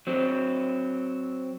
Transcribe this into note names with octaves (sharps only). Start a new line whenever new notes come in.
F#3 C4